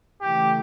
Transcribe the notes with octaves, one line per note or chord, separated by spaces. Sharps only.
C#3 E3 A3 G4